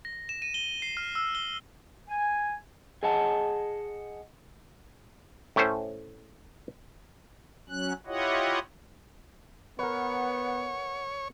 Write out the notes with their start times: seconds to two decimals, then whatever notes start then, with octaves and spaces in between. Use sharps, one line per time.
0.05 A#6
0.29 E7
0.42 D#7
0.54 G7
0.82 C7
0.97 F6
1.15 E6
1.35 G7
2.09 G#5
3.03 G#4 D#5 F#5 A5
5.56 A2 A3 C#4 C5
7.69 F#3 C#4 F#6
8.07 E4 F4 G4 C#5 D#5 F#5
9.79 B3 A#4 B4 C#5 F#5